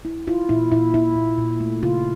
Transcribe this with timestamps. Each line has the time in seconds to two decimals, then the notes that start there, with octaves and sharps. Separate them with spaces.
0.05 E4
0.27 E4 F4
0.49 A#2 E4
0.71 A#2 E4
0.94 E4
1.16 A#2
1.38 A#2
1.60 A3
1.82 C#3 F4